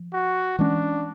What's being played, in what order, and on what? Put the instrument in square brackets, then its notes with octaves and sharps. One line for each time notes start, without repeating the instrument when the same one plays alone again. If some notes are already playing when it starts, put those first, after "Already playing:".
Already playing: [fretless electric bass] F3
[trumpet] F#4
[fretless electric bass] E3 G#3 C#4 [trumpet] D4